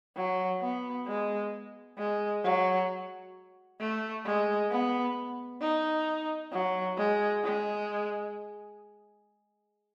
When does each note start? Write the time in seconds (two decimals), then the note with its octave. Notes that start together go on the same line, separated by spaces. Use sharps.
0.16 F#3
0.61 B3
1.07 G#3
1.98 G#3
2.44 F#3
3.80 A3
4.26 G#3
4.71 B3
5.61 D#4
6.52 F#3
6.98 G#3
7.44 G#3